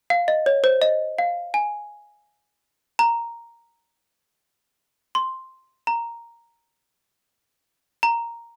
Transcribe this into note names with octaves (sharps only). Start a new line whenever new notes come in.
F5
D#5
C#5
C5
D#5
F5
G#5
A#5
C6
A#5
A#5